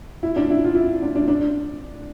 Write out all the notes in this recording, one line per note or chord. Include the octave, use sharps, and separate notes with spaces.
E4
D4
E4
F4
E4
D4
D4
D4